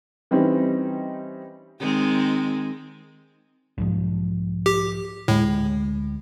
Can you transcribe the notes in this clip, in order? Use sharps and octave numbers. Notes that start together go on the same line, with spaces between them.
E3 G3 C4 C#4 D#4
D#3 G#3 C4
B1 G#2 F3
G4
D2 A2 G#3